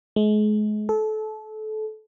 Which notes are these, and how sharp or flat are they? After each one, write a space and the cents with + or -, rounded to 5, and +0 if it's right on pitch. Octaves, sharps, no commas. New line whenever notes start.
G#3 +35
A4 -25